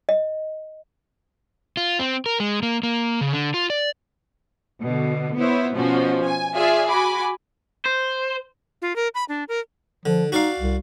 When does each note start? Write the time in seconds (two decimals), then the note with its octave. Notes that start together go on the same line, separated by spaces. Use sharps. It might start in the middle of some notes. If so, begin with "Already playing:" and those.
0.09 D#5
1.77 F4
1.99 C4
2.26 A#4
2.40 G#3
2.63 A#3
2.83 A#3
3.21 C#3
3.33 D3
3.54 F4
3.70 D5
4.81 B2 D3
5.36 B3 E4 C5 C#5
5.75 B2 F3 C#4 F#4
6.25 G#5
6.54 F4 G#4 D5 E5 G#5
6.88 F#4 G#5 B5 D6
7.85 C5
8.82 F4
8.96 A#4
9.15 B5
9.29 D4
9.49 A#4
10.06 D3 F3
10.32 D#4 F#4 D5 F5
10.60 C2